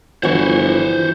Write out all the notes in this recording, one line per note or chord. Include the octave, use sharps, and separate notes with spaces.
G1 E3 F3 F#4 C5 C#5